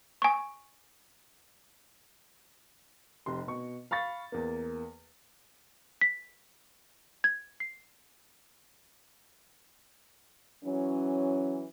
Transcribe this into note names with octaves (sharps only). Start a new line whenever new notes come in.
G#5 C#6
F1 C3 C6
B2 C#6
F5 B5 C#6 A6
E2 A#3
B6
G#6
C7
E3 F#3 C#4